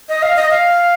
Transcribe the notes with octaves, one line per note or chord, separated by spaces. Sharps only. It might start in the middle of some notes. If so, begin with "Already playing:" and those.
D#5
F5
D#5
F5